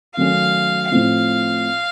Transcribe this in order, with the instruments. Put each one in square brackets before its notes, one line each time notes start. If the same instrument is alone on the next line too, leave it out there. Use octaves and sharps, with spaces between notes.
[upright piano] D#3 F#3 A3 C#4 [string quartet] F5
[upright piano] A2 F3 C4 [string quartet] F5